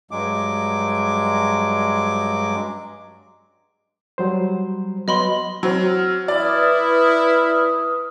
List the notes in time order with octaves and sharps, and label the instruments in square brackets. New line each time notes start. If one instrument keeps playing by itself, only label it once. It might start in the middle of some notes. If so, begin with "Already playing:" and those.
[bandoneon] G2 F#3 G#3 D6
[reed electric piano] F#3 G3 C5
[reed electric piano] F#3 B3 [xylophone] D#5 B5 C6
[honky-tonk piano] F#3 C4 [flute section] F6
[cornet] E4 [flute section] B4 D#6 F6 [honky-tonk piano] D5